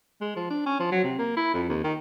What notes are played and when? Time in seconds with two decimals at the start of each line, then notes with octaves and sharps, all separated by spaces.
0.21 G#3
0.36 F3
0.50 D4
0.66 C#4
0.80 F3
0.92 F#3
1.04 C3
1.19 A#3
1.37 E4
1.54 F2
1.69 D#2
1.84 D#3